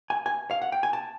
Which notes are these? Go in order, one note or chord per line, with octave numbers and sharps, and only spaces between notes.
G#5
G#5
F5
F#5
G5
G#5
A5